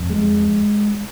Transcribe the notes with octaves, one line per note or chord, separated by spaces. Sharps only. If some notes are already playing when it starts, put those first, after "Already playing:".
Already playing: F2
G#3